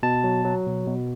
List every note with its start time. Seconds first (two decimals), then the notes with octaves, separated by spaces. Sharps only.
0.03 B2 A5
0.24 F#3
0.45 F#3
0.66 B2
0.87 B2